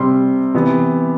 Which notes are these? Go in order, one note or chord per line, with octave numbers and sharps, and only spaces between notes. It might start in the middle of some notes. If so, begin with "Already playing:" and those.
Already playing: C3 G3 C4 C6
C3 E3 B3